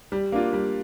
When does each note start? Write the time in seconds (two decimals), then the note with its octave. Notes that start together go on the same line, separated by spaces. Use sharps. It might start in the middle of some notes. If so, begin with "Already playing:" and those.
0.12 G3
0.32 A#3 D4 F4
0.53 G3